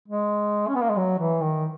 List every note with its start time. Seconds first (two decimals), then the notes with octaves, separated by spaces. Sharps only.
0.08 G#3
0.68 C#4
0.75 B3
0.82 A#3
0.90 G#3
0.97 F#3
1.19 E3
1.41 D#3